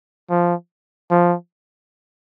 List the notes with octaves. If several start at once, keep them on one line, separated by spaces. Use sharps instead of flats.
F3
F3